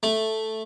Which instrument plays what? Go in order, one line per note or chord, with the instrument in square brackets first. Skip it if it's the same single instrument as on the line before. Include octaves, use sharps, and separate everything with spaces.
[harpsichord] A3